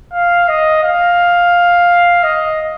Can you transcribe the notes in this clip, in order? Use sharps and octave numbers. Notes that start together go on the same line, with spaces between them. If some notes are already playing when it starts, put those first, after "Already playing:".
F5
D#5
F5
D#5